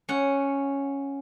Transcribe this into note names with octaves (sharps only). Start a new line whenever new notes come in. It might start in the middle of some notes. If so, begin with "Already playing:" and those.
C#4 F#5